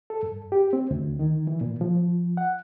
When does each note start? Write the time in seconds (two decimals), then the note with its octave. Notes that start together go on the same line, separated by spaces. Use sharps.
0.10 A4
0.23 G2
0.52 G4
0.73 C4
0.91 D2
1.19 D#3
1.47 E3
1.61 A#2
1.81 F3
2.37 F#5